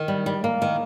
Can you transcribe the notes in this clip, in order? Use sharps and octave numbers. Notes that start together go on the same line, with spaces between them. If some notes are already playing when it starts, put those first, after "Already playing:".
Already playing: D#3
G3
G3
A#3
D#3